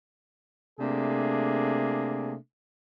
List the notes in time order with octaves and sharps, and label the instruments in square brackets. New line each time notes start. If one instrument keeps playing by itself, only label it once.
[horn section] C3 A3 A#3 D4 G#4